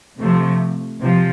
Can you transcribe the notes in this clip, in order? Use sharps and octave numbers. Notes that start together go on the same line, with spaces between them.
C3 F3 A3
C3 F3